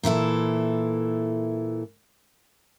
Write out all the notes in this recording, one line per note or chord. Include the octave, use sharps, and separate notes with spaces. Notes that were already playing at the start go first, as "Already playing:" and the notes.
A#2 E3 E4 A4